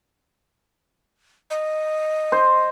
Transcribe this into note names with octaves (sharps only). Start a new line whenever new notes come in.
D#5
C5